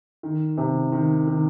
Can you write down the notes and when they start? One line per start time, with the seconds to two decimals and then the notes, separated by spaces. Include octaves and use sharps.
0.23 D#3
0.58 C3
0.92 D#3
1.27 D#3